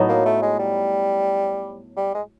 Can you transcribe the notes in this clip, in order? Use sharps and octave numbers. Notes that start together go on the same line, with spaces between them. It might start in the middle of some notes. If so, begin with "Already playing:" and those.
Already playing: A2 F#3 B3 D#4
A#3
A3
G#3
G3
G3
G#3